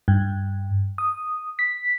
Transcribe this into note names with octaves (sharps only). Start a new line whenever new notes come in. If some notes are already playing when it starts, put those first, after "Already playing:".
G2
D#6
B6